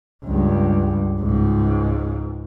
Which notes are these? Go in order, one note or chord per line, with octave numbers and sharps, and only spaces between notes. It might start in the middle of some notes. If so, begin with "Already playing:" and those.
C#2 G2
C#2 G#2